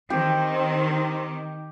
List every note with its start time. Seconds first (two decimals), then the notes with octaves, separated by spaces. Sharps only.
0.10 D#3 C4 G4